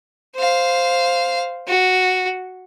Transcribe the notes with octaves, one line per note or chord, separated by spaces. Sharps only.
C5 F5
F#4